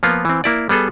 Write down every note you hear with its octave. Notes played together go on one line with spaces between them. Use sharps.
F3 A#3 B3 F4
E3 C4
A#3 E4 D5
G3 B3 G#4 A4